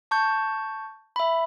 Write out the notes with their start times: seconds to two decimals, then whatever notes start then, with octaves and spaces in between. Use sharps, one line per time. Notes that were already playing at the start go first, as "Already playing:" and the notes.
0.11 A5 C#6 G6
1.16 E5 B5